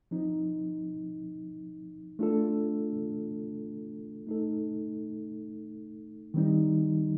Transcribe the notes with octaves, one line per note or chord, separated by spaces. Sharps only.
F3 C4 D#4
A3 D4 F4 A4
A3 D#4 A4
D#3 G3 C4 D#4